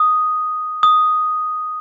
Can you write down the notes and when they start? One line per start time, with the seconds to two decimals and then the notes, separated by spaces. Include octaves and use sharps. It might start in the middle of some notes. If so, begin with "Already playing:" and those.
Already playing: D#6
0.83 D#6